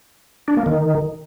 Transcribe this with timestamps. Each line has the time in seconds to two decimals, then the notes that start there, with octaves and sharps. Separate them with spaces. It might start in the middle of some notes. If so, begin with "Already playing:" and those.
0.48 D4
0.57 A#3
0.66 D#3